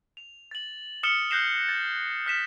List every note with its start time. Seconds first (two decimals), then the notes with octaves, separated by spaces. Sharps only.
0.17 F7
0.51 A6 F#7
1.03 D#6 F6 A6 C#7 E7 G7
1.30 F#6 G6 A#6 C7 E7 F7
1.69 A6
2.26 F6 B6 E7